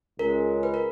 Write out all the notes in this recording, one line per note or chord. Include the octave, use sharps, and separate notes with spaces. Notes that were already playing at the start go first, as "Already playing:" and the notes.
C#2 C#3 G#3 A#4
B4
A#4